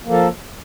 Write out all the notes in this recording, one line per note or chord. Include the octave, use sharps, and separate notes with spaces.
F3 A#3 A4